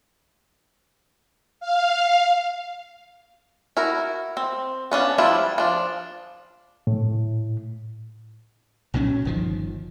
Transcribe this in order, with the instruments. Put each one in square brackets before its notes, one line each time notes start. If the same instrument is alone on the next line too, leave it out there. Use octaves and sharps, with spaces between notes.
[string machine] F5
[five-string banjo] E4 F#4 A#4
C4
B3 C#4 D4 F5
F3 G3 D4 E4 F4
F3 D4
[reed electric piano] A2
[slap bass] B1 A#2 F#3 C#4
G1 D#3 F3